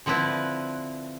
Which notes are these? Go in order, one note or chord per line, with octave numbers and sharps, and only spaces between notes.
D3 F3 C4 E4 B4